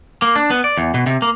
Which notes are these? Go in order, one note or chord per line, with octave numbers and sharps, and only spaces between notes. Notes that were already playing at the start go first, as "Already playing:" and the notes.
A#3
D4
B3
D5
E2
B2
C3
A#3